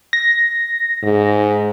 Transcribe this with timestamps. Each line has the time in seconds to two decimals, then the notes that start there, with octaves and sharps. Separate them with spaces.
0.13 A#6
1.03 G#2